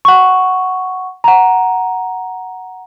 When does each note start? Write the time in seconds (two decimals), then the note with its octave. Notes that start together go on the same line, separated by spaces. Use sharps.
0.05 F#5 C#6
1.24 F#5 A#5